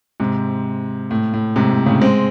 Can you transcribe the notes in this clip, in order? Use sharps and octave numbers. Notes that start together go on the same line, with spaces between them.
G#2 C3
A2
A2
G#2 C3
A2
A2 C#3
G#3 C4